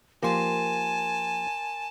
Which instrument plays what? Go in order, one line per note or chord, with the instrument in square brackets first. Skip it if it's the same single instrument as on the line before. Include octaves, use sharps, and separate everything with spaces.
[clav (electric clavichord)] F3 A#3 G4 [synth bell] A#4 C6 [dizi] G#5 [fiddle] A5